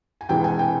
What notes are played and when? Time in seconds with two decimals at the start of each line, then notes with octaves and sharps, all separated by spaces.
0.21 G#5
0.29 E1 E2 C3 E3 G#3 G5
0.44 G#5
0.59 G5